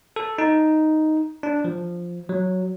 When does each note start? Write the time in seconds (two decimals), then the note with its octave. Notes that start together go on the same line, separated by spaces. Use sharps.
0.16 A4
0.38 D#4
1.43 D4
1.64 F3
2.29 F#3